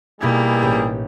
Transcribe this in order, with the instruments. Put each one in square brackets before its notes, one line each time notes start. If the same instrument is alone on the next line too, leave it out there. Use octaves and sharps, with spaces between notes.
[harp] B2 D#4 G#6 [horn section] G3 E4 G#4 [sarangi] A#3
[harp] A1 G4 G5